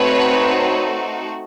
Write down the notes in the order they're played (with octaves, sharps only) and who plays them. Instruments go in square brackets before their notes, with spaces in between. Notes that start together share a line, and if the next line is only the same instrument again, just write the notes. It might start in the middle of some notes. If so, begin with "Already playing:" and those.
Already playing: [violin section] A3 C4 D#4 F#4 B4 C#5